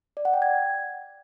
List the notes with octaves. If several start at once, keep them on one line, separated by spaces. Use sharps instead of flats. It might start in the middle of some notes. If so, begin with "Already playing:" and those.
D5
F#5
G5
G#6